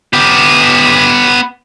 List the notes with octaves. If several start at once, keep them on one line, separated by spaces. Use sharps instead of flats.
B3 G4